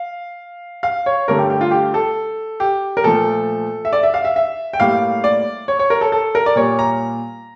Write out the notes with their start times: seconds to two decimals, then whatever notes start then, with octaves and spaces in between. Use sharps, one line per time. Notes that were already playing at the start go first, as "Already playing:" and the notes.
Already playing: F5
0.83 F5
1.06 C#5
1.28 G2 D3 A3 A#4
1.39 G4
1.50 G4
1.61 F4
1.71 G4
1.94 A4
2.60 G4
2.97 A#4
3.04 A#2 F3 A3 A4
3.85 E5
3.93 D5
4.03 E5
4.14 F5
4.25 E5
4.36 E5
4.73 G5
4.80 A2 G3 A#3 F5
5.24 D5
5.68 C#5
5.79 C#5
5.90 A#4
6.01 A4
6.12 A4
6.35 A#4
6.46 D5
6.56 A#2 G3 A#3 C#5
6.79 A#5